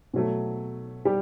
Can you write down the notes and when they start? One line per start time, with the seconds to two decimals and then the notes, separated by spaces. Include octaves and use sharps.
0.14 B2 F#3 A3
1.05 G3 G4